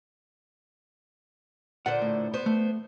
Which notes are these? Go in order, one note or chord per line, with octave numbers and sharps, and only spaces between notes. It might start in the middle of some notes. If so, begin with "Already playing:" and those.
A#2 D3 C5 F#5
A2
B3 C5
A3